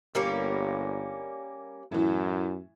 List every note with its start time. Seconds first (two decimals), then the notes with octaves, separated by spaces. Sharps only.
0.15 G1 G3 A#3 C#4
1.92 F#2 A2 E3